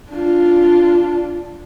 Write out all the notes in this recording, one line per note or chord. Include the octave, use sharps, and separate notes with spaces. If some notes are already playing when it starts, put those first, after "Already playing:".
D4 F4